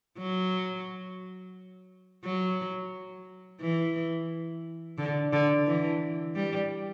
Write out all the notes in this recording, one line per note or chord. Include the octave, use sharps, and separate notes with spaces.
F#3
F#3
E3
D3
D3
E3
G3